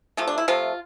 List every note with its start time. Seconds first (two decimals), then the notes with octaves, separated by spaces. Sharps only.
0.17 C3 F3 A3 F4
0.27 D4
0.38 E4
0.48 C3 F3 A3 F4